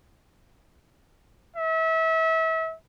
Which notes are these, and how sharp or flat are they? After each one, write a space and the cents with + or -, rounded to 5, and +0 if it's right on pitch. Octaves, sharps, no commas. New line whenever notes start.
E5 -30